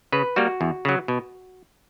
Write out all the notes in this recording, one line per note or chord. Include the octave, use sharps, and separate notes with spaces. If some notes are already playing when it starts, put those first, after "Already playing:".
C#3 B4
G3 A#3 F#4
E2
C#3 F#3
B2